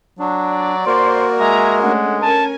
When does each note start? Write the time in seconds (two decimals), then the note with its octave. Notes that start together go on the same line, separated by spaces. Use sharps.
0.19 F#3 D4
0.48 D5
0.86 A#3 F#4 A#4 C5 C6
1.40 G#3 E5 G#5 A#5
1.81 A3 C#4 D4 F#5
2.22 C#4 A#4 G#5 A5